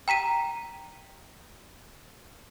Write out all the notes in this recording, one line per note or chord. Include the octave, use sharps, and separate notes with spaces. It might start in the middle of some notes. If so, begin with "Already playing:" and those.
G5 A#5 B6 D#7